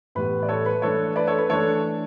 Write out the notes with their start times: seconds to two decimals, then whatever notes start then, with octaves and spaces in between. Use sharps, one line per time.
0.15 A2 E3 G3 B3 B4
0.43 D5
0.48 A4 C#5
0.66 B4
0.82 E3 A3 D4 A4 C#5
1.16 B4 D5
1.27 A4 C#5
1.38 B4
1.49 E3 A3 D4 A4 C#5